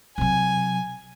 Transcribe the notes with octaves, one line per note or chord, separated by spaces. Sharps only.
C3 F#3 G#5